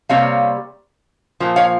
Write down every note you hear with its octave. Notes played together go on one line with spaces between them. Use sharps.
C3 G3 A#3 C#5 F5
A#2 F3 A#3
C#5 F5